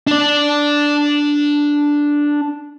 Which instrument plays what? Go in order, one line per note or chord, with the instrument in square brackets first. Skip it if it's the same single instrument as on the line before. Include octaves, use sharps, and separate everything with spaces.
[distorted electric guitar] D4 D5